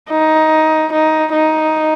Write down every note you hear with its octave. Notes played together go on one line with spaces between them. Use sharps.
D#4
D#4
D#4